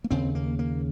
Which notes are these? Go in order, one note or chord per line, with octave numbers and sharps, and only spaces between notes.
A#3
D#2 C#3 C4
A#3
A#3